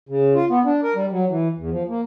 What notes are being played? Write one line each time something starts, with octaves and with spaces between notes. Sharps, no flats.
C#3
F4
B3
D4
A#4
G3
F#3
E3
E2
F3
A#3